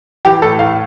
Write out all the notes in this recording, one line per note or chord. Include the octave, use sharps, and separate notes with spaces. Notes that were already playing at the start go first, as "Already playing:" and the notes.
E3 G4
A2 A4
A2 F5